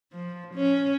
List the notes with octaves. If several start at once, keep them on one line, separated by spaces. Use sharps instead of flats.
F3
C#4